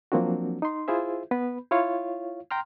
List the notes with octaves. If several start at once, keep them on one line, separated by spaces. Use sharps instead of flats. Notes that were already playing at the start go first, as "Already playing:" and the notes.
F3 F#3 A#3 C4 D4 F#4
D#4 C6
E4 F4 G#4 C5 E5
B3 B4 B5
E4 F4 C#5 F5
G5 A#5 C6 F6